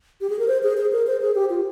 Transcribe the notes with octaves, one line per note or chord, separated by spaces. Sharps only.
G4
G#4
A#4
C5
G#4
G#4
A#4
C5
G#4
G4
F4